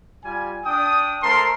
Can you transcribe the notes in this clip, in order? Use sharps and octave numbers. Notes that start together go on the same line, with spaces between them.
G3 F4 G#5
D4 G5 D#6
A3 A#4 C5 A5 C6